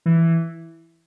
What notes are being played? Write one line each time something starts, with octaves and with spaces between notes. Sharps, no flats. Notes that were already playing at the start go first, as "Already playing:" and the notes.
E3